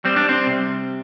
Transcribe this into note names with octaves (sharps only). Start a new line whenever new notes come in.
G3 C4
D4
C4
C3